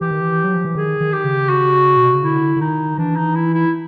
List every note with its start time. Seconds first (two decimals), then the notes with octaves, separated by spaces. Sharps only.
0.01 E3 G4
0.11 D#3
0.21 E3
0.44 F#3
0.54 F3
0.65 E3
0.75 D#3 G#4
1.00 D#3
1.12 G4
1.24 C#3
1.49 F#4
1.97 B2
2.06 C3
2.15 C#3
2.24 D3 E4
2.56 D3
2.61 D#3 D#4
2.98 E3 D4
3.16 D#4
3.35 E4
3.54 E4